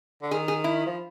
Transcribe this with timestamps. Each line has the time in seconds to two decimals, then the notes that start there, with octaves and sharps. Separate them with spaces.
0.22 D3
0.31 D#3 G#4
0.48 G#4
0.64 E4
0.86 F3